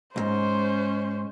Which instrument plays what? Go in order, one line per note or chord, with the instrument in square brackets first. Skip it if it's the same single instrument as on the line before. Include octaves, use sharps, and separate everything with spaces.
[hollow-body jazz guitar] B1 G#2 [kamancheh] C#4 C5